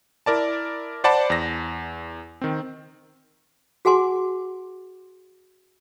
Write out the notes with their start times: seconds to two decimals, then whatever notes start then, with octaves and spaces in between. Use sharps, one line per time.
0.26 E4 A#4 D5 A5
1.04 C5 D5 F#5 A5 B5
1.30 E2 A#6
2.41 D#3 C4
3.85 F#4 G#4 F#5 G#5 C6 D6